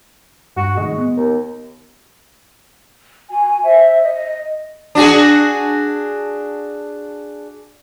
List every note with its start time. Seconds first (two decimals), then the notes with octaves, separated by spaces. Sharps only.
0.57 G2 F#4
0.77 A2 D#3 G#3
0.98 B3
1.17 D#2
3.30 F#4 G#5
3.63 C5 E5
4.02 D#5
4.95 D4 F#4 G#4